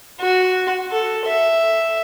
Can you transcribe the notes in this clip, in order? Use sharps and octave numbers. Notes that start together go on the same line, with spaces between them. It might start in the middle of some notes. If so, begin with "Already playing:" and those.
F#4
A4
E5